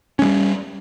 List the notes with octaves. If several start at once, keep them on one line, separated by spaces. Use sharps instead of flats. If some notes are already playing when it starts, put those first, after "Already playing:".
G3 G#3 C#4